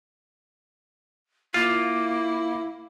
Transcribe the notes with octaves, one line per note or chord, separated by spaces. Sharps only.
A#3 E4 F4